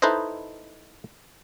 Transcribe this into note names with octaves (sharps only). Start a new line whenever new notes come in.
D#4 E4 A4 B4 C5 D#5